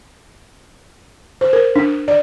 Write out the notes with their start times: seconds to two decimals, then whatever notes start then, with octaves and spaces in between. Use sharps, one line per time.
1.41 C5
1.53 A#4
1.76 D4
2.08 D5